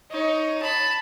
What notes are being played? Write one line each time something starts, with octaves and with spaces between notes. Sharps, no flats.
D#4 C#5
A5 B5